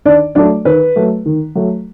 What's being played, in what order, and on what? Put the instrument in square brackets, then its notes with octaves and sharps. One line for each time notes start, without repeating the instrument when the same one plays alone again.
[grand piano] D#3 D4 D5
F#3 A3 D4 D5
D#3 B4
F#3 A3
D#3
F#3 A3